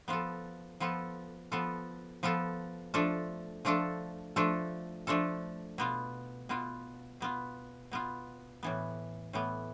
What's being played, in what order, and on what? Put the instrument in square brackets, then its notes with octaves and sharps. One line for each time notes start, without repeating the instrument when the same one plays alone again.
[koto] F3 B3 F4 A4
F3 B3 F4 A4
F3 B3 F4 A4
F3 B3 F4 A4
F3 A3 D4 F4 A4
F3 A3 D4 F4 A4
F3 A3 D4 F4 A4
F3 A3 D4 F4 A4
B2 B3 F4
B2 B3 F4
B2 B3 F4
B2 B3 F4
A2 E3 B3
A2 E3 B3